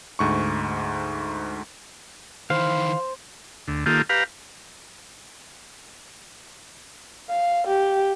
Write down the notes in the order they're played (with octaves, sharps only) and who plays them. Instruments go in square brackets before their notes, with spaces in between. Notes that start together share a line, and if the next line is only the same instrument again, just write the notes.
[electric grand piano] D2 G#2 C#6
[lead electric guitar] D#3 E3 [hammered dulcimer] C5 [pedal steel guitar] F5
[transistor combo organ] D2
D#3 A#3 F4 G4 A4
G4 B4 F5 A#5
[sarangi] F5
G4